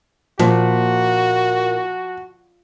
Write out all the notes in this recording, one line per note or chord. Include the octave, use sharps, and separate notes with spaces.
A#2 F3 F#4